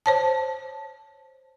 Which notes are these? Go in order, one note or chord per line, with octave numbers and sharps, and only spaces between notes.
C5 C#5 A5